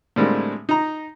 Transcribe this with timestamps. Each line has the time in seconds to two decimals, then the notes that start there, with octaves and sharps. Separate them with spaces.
0.16 A2 D3 G3 G#3 A#3 C4
0.69 D#4 A#5